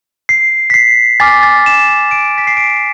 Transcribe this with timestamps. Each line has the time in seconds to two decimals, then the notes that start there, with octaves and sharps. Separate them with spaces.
0.29 C7
0.70 B6
0.74 C7
1.20 G#5 D6 F6 A6
1.43 A6
1.66 E7
1.88 E7
2.11 D7
2.38 B6
2.47 C7
2.57 D7